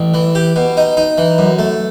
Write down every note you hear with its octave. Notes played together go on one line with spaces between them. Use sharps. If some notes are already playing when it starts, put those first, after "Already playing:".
Already playing: A1
E3
G4
B2
D#4
D#4
E3
F#2
A3